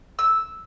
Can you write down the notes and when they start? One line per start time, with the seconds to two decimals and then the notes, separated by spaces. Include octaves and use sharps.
0.19 E6